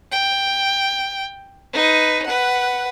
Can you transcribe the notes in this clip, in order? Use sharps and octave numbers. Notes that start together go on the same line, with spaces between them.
G5
D#4 B4
B4 F#5